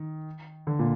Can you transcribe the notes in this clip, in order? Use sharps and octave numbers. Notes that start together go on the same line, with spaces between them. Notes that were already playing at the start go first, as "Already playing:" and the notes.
Already playing: D#3
D3
A#2